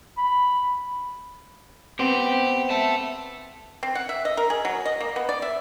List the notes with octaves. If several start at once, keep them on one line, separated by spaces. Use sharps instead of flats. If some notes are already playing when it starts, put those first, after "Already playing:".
B5
B3 C4 G4 C5
E5 A5
C4
F#5
E5
D#5
A#4
G#4
F#3
D#5
A#3
B3
D5
E5